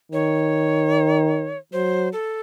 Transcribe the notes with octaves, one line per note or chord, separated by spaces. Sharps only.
D#3 C#5
F#3 C5
A4